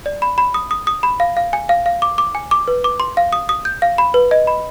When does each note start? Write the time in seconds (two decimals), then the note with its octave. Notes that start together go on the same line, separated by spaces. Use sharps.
0.06 D5
0.22 B5
0.38 B5
0.54 D#6
0.71 D#6
0.87 D#6
1.03 B5
1.20 F5
1.37 F5
1.53 G#5
1.69 F5
1.86 F5
2.02 D6
2.18 D6
2.35 G#5
2.51 D6
2.68 B4
2.84 D6
3.00 C6
3.17 F5
3.33 D#6
3.49 D#6
3.65 G6
3.82 F5
3.98 B5
4.14 B4
4.31 D#5
4.47 B5